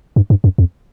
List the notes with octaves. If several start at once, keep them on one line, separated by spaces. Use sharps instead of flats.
G2
G2
F#2
F2